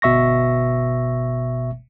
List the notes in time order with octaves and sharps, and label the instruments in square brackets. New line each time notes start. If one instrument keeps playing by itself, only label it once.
[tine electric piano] G1 B2 E5 C#6 A#6